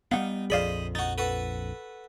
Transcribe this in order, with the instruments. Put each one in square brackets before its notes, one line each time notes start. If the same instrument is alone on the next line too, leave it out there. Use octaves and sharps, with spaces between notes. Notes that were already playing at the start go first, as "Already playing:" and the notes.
[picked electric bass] G3 A#3 B3 [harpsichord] D#4 [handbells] F5 F#5
[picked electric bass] A#1 F2 [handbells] G#4 D5 F5 [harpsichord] C5 D#5 B5
[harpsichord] D#4 F#4 [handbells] A6
[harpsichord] F#4 A4 B4